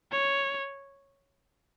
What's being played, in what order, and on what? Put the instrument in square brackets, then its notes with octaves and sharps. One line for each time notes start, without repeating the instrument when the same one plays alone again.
[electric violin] C#5